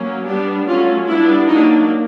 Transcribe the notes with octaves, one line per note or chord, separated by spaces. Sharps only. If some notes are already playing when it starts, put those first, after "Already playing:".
Already playing: F#3 A#3 C#4
G3 B3 D4 G4
F#3 A3 C#4 F4
G3 B3 D4 E4
F#3 A#3 D4 D#4